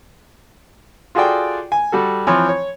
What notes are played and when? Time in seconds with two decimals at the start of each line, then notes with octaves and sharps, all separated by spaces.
1.15 F4 F#4 G#4 A4 D5 G5
1.72 G#5
1.92 G3 F#4 A4
2.27 E3 F3 C4 C#5
2.49 C#5